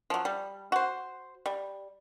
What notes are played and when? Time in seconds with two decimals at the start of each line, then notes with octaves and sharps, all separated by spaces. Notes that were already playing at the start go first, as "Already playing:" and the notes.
0.10 F3 F#3
0.25 G3
0.72 F#4 C5
1.46 G3